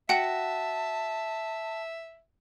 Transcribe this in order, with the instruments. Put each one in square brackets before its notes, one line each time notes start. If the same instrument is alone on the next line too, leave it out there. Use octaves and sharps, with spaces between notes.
[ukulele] F#4 [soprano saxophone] E5 [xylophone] F#5 G5 C#7 [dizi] A5